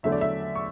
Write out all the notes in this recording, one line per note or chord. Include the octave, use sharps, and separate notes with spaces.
E2 D3 F#3 A3 E5
D5
E5
C#6